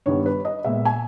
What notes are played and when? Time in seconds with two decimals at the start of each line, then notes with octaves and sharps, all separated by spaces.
0.06 G2 D#3 G3 B3 C#5
0.26 B4
0.45 D#5
0.65 A#2 G#3 B3 E5
0.85 G#5